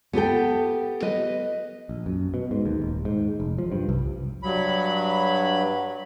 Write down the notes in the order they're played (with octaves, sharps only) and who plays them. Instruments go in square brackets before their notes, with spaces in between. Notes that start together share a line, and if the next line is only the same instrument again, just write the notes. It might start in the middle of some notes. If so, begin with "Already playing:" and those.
[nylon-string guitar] B3 G4 A4 G5
B4 D#5
[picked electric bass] A#1
F#2
B2
G#2
D#2
D#1
G#2
F1
F3
G2
C2
[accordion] G2 F#3 B5